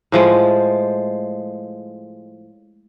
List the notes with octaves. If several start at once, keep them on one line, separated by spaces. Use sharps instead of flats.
A2 F3 G#3